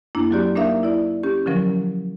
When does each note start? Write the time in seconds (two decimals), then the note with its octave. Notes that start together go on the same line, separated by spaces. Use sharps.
0.15 F#2 A#3 D4 E4
0.31 F#3 C4 F#4 G4 D5
0.56 A#3 D4 D#4 A#4 E5 F5
0.83 E4 D5
1.23 C#4 G4
1.46 D3 F3 F#3 C#4 A#4